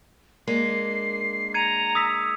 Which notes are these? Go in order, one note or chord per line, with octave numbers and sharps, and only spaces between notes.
G#3 A#3 D4 C7
A#5 G#6 C#7 D#7
D#6 E6 B6